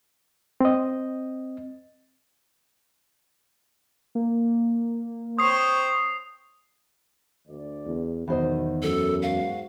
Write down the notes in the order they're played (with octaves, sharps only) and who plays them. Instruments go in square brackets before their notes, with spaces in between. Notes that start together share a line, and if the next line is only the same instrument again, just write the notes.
[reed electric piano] C4 D#5
[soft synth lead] A#3
[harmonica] C4 C#5 [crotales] D#6 C7
[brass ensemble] D2 D5
[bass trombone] E2
[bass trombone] B1 [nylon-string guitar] E2 C5 D#5 [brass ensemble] D#3
[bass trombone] F#2 [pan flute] A4
[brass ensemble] G#2 F#4 [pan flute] F5